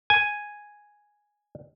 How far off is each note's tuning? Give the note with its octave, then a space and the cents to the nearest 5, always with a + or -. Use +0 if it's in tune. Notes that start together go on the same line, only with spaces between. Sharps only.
G#5 +0